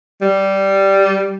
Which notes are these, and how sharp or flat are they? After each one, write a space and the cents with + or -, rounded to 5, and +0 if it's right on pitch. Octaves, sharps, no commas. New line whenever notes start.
G3 -10